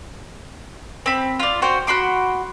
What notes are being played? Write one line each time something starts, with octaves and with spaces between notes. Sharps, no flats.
C4 B5
F4 D5
F#4 C5 G5
F#4 B5 C6 D6